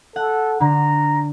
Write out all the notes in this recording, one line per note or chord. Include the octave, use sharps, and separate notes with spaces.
A4 F#5
D3 A#5